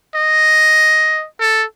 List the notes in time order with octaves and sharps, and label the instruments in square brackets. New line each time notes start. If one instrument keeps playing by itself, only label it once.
[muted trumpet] D#5
A4